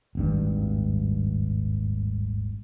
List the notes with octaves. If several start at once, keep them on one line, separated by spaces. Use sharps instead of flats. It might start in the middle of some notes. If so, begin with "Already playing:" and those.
D#1 G#1 G2